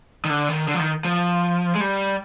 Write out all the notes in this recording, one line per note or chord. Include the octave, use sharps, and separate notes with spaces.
D#3
D3
D#3
D3
F3
D#3
F3
G#3
G3